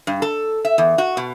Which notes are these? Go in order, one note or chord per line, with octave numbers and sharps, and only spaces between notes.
G2
A4
E5
E2
F#4
B2